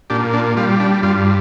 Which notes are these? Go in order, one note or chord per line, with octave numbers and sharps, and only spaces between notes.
A#2 D4 G4
D4
G3 F4
D4
G2 F4